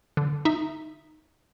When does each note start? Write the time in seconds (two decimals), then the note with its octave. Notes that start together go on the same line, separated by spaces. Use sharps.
0.17 D3
0.45 D#4 E5